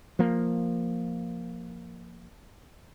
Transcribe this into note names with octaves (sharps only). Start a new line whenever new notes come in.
F3 A#3